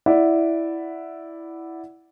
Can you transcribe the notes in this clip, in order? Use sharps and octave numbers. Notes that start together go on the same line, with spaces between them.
E4 D5 E5 F#5